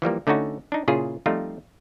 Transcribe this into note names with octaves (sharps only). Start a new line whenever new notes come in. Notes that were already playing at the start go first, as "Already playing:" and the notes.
E3 F3 G3 A#3
D3 A3 C#4 D#4 F#4
D4 D#4
A#2 C#3 E4 F4 G#4
F3 G3 A3 C4 D#4 F4